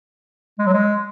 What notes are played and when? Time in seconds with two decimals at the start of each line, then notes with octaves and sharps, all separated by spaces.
0.59 G#3
0.66 F#3
0.74 G#3